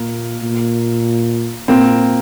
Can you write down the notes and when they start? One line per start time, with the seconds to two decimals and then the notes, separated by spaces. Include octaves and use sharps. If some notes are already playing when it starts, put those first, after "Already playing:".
Already playing: A#2 A#3
0.43 A#2
1.68 A#2 A#3 C4